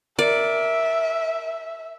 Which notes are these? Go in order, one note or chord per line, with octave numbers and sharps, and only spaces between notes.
A#4 D5 E5 D7